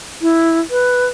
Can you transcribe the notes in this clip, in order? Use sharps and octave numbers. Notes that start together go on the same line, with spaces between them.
E4
B4